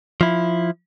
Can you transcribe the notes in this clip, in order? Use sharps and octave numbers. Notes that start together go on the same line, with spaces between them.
F3 E4